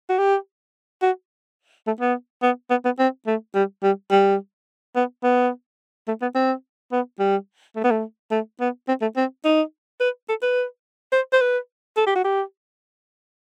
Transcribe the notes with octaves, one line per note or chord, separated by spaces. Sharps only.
F#4
G4
F#4
A3
B3
B3
B3
B3
C4
A3
G3
G3
G3
B3
B3
A3
B3
C4
B3
G3
A3
B3
A3
A3
B3
C4
A3
C4
D#4
B4
A4
B4
C5
C5
B4
A4
G4
F#4
G4